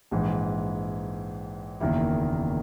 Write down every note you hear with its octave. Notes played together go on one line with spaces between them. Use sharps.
A#1 G#2 E3
F#1 E2 D#3 A#3 E4